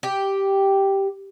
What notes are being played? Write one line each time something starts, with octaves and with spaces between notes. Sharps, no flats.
G4